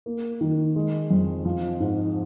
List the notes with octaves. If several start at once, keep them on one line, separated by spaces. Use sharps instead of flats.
A#3
D#3
G#3
F2
F3
G#2